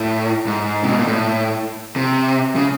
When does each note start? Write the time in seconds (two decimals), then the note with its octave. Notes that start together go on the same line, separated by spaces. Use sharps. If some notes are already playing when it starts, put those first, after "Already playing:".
Already playing: A2
0.47 G#2
0.82 C3
0.90 B2
0.99 A#2
1.07 A2
1.96 C3
2.56 C#3